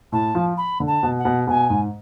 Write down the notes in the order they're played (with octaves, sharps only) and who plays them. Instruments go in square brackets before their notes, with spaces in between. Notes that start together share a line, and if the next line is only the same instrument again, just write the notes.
[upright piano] A2 [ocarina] A5
[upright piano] F3
[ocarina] B5
[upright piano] D3
[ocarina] A5
[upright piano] B2
[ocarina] F#5
[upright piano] B2
[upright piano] B2 [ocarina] G#5
[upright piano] G#2